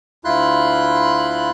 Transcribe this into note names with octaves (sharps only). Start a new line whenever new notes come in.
D2 E4 F4 B5 C6 F#6